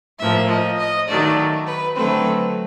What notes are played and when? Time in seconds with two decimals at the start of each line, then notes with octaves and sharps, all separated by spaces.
0.19 A2 F3 A#3 E5
0.49 D#5
0.78 D#5
1.07 D#3 F#3 A3 D5
1.66 B4
1.95 D3 F#3 A3 C4 B4